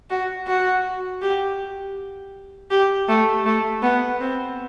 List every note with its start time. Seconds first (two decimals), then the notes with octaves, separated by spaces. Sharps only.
0.10 F#4
0.47 F#4
1.22 G4
2.71 G4
3.08 A3
3.46 A3
3.82 B3
4.21 C4